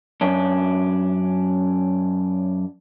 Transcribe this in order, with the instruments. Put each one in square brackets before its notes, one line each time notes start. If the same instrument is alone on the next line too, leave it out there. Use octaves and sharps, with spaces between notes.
[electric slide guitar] F#2 C#4 D4